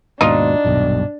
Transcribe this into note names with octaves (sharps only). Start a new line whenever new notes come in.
D#2 G#2 B2 D4 D#4 F4
D#1 B1 G2 B2